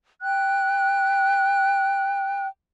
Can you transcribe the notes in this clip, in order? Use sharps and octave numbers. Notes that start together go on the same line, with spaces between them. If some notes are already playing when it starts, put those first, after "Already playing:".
G5 F#6